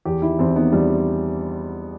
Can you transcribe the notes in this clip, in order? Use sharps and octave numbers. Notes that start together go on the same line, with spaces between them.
E2 G4
D#3 E4
E2 C4
D#3 B3
E2 G3